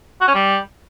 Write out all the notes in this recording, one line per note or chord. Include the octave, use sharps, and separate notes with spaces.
F#4
C#4
G3